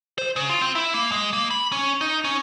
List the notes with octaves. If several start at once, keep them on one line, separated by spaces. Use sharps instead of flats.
C5
C#3
F4
C4
E4
A#3
G#3
A#3
B5
C#4
D#4
C#4